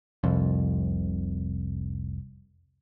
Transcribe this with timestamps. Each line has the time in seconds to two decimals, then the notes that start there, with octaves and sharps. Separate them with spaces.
0.24 F1 C2 F2